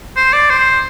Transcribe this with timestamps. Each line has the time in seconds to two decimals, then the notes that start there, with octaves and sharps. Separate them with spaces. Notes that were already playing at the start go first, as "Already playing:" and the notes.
0.16 C5
0.33 D5
0.50 C5